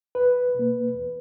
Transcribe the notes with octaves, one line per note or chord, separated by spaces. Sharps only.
E2 B4
B2 A#3
E2